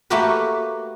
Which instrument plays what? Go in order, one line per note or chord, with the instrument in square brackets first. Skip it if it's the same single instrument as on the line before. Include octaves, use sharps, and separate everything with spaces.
[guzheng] A3 A#3 F#4 G4 A#4 B4